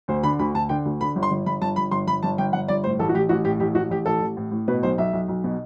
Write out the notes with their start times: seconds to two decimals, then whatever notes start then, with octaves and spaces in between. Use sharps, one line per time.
0.08 D2 C5
0.23 D3 B5
0.39 D2 B5
0.54 D2 A5
0.69 D3 G5
0.85 D2
1.01 D3 B5
1.15 G1
1.23 C6
1.31 G1
1.46 G1 B5
1.61 G1 A5
1.76 G1 B5
1.91 G1 C6
2.07 G1 B5
2.23 G1 A5
2.38 G1 G5
2.53 G1 F#5
2.68 G1 D5
2.84 A2 C5
2.99 A1 A4
3.09 F#4
3.14 A1 G4
3.29 A1 F#4
3.45 A2 G4
3.60 A1 G4
3.75 A1 F#4
3.90 A1 G4
4.06 A1 A4
4.21 A1
4.37 A2
4.51 A2
4.68 B2 B4
4.83 B1 C5
4.98 B1 E5
5.13 B1
5.28 B1
5.44 B2